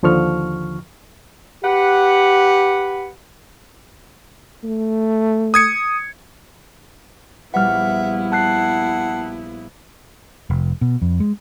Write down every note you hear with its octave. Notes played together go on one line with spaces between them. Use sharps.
D#2 D3 F3 C#6 F6
G4 B4 F#5
A3
D#6 G#6 C#7
A#1 G3 B3 E4 B4 E5 F#5 F6
F#5 A5 F#6 C7
F1
B2
F2
G#3